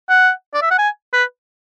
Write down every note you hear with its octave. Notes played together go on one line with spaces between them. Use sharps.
F#5
D5
E5
F#5
G#5
B4